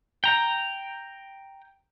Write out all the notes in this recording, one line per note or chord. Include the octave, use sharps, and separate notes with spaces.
G5 A#5